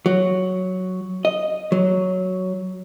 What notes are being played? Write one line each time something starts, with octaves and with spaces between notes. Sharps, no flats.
F#3
D#5
F#3